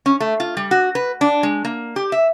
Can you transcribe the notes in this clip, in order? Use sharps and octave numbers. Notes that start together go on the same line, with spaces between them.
C#4
A3
F4
G3
F#4
B4
D4
G#3
A#3
G4
E5